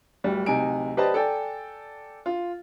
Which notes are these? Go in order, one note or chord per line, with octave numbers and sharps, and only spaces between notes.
D1 G3
D1 C3 D#4 G4 G#5 D7
G4 B4 C5 D5 D#5 A5
A4 D5 G5 G#5
F4